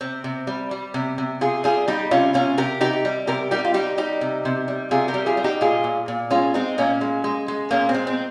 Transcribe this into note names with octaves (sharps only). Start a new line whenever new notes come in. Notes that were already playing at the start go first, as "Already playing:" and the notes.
C3 C4
C3
G3
G3
C3
C3
C3 F4 G#4
G3 F4 G#4
G3 D#4 G4
C3 C#4 F4
C3 C#4 F4
C3 G4 A#4
C3 D#4 G4
G3
C3 G4 A#4
G3 D#4 G4
F4
G3 D#4 G4
G3 D#4 G4
C3
C3
G3
C3 F4 G#4
G4 A#4
G3
F4 G#4
G3
D#4 G4
A#2 F4 G#4
A#2
A#2
G#3 C#4 F4
G#3 C4 D#4
A#2 A#3 C#4
G#3
G#3
G#3
A#2 A#3 C#4
C4
G#3
C4